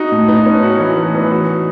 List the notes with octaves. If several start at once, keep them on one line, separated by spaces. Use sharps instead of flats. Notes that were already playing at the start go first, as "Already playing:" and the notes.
Already playing: D#4 F#4
A2
B3 D#4
B3 C#4
F#4
E3
B3
E3
F#4